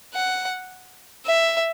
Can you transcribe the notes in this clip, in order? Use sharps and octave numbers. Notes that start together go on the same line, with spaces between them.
F#5
E5